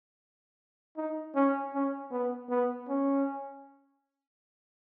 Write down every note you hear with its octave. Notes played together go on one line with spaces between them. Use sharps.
D#4
C#4
C#4
B3
B3
C#4